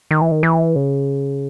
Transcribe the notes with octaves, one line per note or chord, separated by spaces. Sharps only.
D#3
E3
D#3
E3
C#3